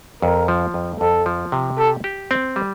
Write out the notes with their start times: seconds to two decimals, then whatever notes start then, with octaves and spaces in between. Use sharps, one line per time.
0.22 F2 A#4
0.48 F3
0.74 F2
1.00 F2 A4
1.26 F3
1.52 C3
1.78 G4 A4
2.04 G4
2.31 C4
2.56 G3